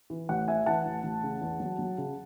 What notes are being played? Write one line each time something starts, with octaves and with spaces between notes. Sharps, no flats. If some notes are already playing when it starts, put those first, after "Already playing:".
E3
A1 F#5
E3 E5 G#5
E3 F#5 A5
A1
A1
C#3
E2
F#3
F#3
C#3